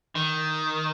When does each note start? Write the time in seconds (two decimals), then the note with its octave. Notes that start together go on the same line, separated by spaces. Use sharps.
0.15 D#3